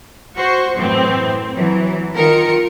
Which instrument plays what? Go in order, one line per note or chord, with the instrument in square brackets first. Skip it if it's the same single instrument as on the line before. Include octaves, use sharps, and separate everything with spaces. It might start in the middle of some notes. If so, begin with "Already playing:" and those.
[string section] F#4 C5 C#6
F#2 A2 E3 C4
E3 F#3
D#3 F4 A#4 C#7